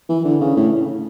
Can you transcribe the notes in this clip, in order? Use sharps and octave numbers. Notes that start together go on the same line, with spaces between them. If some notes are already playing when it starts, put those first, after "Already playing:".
E3
D3
C#3
A2